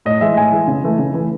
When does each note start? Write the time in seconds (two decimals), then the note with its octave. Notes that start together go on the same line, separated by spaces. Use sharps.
0.05 A2 D#5
0.21 E3 G#3 E5
0.36 A2 G#5
0.52 E3 G#3
0.68 C#3
0.84 E3 A3
0.99 C#3
1.14 E3 A3